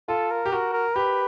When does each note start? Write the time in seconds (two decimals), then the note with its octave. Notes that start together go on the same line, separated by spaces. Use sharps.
0.08 F4 A4
0.31 A#4
0.46 G4
0.52 F#4 A#4
0.73 A#4
0.95 G4 B4